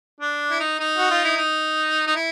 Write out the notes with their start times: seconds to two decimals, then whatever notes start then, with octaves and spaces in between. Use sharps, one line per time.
0.21 D4
0.51 E4
0.60 D#4
0.79 D#4
0.98 F#4
1.11 F4
1.25 E4
1.37 D#4
2.07 D#4
2.16 E4